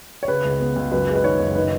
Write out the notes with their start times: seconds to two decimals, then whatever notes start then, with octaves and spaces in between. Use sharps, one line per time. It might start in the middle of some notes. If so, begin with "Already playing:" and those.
0.23 C#5
0.28 C#3 B4
0.45 C#2
0.60 B3
0.76 C#2
0.91 F#2 B4
1.08 G#3
1.16 B4
1.24 D#3 C#5
1.40 F#1
1.55 D#3 B4